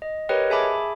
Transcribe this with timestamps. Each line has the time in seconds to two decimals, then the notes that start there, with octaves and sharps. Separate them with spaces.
0.02 D#5
0.29 G4 A#4 B4 C#5 D#5 G5
0.50 G#4 E5 G#5 A5 B5 D6